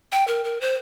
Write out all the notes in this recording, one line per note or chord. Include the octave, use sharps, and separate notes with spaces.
G5
A#4
A#4
C5